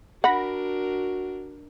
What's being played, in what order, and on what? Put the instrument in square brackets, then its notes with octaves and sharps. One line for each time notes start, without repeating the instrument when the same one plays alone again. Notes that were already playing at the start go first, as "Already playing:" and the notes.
[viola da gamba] D4 A#4 [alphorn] F#4 [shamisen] F#5 [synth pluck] B5 A#6